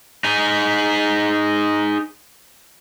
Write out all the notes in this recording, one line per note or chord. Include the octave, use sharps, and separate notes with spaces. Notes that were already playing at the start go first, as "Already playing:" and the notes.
D#4 G#4